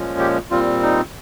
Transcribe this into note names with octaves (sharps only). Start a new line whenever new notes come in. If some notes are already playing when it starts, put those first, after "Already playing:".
Already playing: A#2 F3 G#3 C#4
G4
A#2 G3 C4 F4
D#4